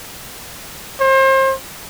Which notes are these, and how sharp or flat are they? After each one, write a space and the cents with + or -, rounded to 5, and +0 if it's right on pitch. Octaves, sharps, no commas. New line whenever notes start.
C5 +35